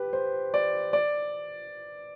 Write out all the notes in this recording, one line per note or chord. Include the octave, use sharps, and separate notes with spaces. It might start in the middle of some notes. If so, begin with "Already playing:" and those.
Already playing: G4 B4
C5
D5
D5